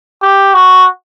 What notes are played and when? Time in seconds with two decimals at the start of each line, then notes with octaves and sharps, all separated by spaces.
0.22 G4
0.54 F#4